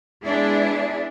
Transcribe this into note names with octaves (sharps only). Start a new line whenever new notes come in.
G#3 B3 D4 E4 G#4